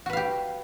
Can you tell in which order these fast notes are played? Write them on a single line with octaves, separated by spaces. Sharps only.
F#4 B4 F5 G4